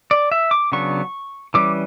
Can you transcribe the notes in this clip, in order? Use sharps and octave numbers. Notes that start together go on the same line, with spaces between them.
D5
E5
D6
C#3 F#3 B3 D4 C#6
E3 G3 C#4 D6